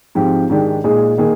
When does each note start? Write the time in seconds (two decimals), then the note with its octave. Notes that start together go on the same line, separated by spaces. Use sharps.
0.15 G#2 F3 C4 G4
0.50 G#2 D#3 G#3 D4 G4
0.84 A#2 G#3 D#4 G#4
1.18 D#3 A#3 D#4 G#4